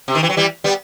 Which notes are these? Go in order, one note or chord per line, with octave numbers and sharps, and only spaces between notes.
C3
D#3
E3
F#3
E3 G3
G3 B3